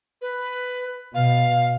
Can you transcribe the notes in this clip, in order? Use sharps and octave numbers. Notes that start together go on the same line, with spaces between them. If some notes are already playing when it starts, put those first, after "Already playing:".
B4
B2 F5